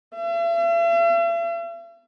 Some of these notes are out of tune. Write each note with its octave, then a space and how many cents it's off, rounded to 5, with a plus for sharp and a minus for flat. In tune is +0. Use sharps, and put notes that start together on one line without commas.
E5 +45